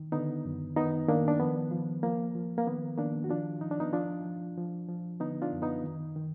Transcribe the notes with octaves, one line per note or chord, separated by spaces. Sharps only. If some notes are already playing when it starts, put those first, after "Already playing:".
Already playing: D#3
D3 B3 D#4
F#2
D#3 B3 D#4
D#3 A#3 D4
D4
F3 B3
F3
F3 A#3
F3
A#3
D#3 B3
D#3 A#3 D4
F#4
F3 D4 F4
F3 D#4
D4
B3 D#4
F3 D4 F4
F3
F3
F3
D3 B3 D#4
D4 F4
F#2
B3 D#4
D#3
D#3